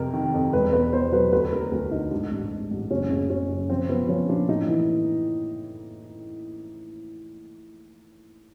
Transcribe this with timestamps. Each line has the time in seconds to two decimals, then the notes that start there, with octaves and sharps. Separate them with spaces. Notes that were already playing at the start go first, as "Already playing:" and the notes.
Already playing: F2 C3 A#4
0.13 D#3
0.34 F2
0.53 E1 B4
0.73 E2 B4
0.92 B2 C5
1.12 F#3 B4
1.32 D2 B4
1.52 D2 A#4
1.72 D2
1.91 D3 D#4
2.11 G#2 D4
2.31 A1
2.51 G#2
2.71 A1
2.91 F#1 C#4
3.10 C#3
3.30 C#3 C#4
3.50 F#2
3.69 F3 C4
3.89 F3 B3
4.08 F3 C#4
4.29 A#2 D4
4.49 A2 D#4
4.68 E3